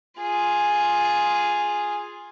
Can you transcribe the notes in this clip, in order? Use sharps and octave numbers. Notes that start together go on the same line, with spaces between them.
F4 G#4